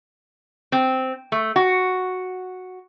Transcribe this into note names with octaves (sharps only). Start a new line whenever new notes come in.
C4
A3
F#4